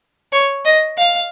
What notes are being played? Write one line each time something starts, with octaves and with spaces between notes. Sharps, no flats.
C#5
D#5
F5